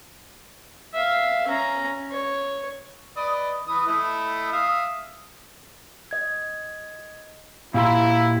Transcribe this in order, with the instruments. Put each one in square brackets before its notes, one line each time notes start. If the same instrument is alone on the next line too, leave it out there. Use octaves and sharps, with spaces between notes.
[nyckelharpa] E5 F5
C#4 A#5
C#5
[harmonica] B4 D5 D#5
E3 B4 D#6
A3 E4 D#5
E5 F5 D#6
[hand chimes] D#5 G#6
[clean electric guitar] A#2 G4 C6 [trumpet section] E4 [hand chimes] F5 A#5